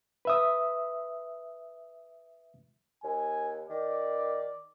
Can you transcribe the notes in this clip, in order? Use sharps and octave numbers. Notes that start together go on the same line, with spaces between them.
B4 E5 D#6
D#2 G#5
D#3 D5